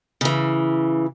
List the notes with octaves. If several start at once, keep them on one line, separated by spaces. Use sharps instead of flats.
C#3 E3